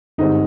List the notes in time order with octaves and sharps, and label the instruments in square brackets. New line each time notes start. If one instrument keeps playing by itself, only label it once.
[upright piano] G1 G2 D3 G#3 C4 D#4